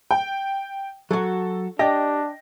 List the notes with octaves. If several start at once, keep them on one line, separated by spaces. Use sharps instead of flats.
G5
F#3 F#4 A4
D4 G4 D5 D#5 G5 A#6